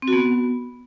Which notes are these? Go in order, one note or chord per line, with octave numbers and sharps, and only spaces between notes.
C4
F#4
B3